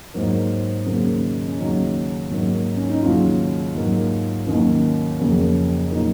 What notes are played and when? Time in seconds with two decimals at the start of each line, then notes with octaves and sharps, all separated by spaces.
0.14 G#2 F#3 A#3 C5
0.86 D#2 C#3 F#3 A#3
1.47 C#4
1.59 D#2 C#3 F#3 D#4
2.31 G#2 F#3 A#3
2.76 C#4
2.90 D#4
3.02 D#2 C#3 F#3 F4
3.75 G#2 F#3 A#3
4.46 D#2 D#3 F#3 A#3 C#4
5.20 F2 C#3 F#3 A#3
5.91 A#2 F#3 A#3 D#4